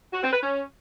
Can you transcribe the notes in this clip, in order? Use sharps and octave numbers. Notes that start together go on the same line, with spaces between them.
F#4
C4
B4
C#4